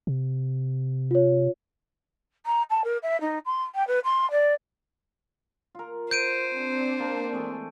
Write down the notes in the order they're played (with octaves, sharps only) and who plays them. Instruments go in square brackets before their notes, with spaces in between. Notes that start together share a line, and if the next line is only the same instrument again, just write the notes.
[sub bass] C3
[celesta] F4 C#5
[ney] A#5
A5
A#4
E5
D#4
C6
G5
B4
C6
D5
[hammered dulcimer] F4 A#4
[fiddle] C5 [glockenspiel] G6 D7 D#7
[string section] C4 D4
[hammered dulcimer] A#3
E3 G#3 A3